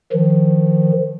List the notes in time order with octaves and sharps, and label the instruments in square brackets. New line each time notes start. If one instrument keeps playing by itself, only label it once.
[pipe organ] D#3 F3